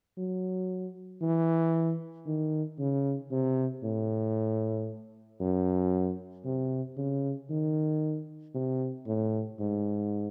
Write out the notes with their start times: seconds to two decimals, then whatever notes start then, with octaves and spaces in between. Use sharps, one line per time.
0.17 F#3
1.21 E3
2.26 D#3
2.79 C#3
3.31 C3
3.83 A2
5.40 F#2
6.45 C3
6.98 C#3
7.50 D#3
8.54 C3
9.07 A2
9.60 G#2